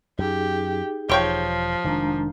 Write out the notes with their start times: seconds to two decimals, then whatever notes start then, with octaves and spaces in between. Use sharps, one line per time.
0.19 F#2 D#4 G4 G#4
1.09 E1 F3 G4 C#5 G5
1.84 F1 D#3 G#3 D4 A#5